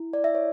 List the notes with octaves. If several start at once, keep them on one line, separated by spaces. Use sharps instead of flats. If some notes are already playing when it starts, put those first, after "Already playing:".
Already playing: E4
D5
E5
C#5